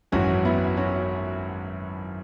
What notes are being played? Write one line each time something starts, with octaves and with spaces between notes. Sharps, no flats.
G#1 F#2 E3 C#4 F#4
B3 E4
C#4 F#4